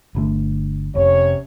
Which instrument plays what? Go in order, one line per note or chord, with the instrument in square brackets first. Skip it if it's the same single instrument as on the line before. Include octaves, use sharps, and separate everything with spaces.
[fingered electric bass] G1 D3 A3
[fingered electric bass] F1 [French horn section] C3 C#4 C#5